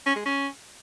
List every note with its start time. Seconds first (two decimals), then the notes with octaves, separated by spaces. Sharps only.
0.06 C#4
0.16 G#3
0.25 C#4